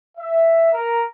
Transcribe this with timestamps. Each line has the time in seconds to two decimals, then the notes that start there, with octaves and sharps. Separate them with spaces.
0.18 E5
0.73 A#4